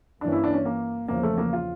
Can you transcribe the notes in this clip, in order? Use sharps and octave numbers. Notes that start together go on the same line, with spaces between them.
G2 E3 A#3 C#4 D4
E4
D4
C#4
A#3
E2 C#3 F3 A#3
A3
A#3
F4